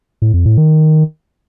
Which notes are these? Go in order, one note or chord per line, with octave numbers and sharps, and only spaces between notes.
A2
F2
A2
D#3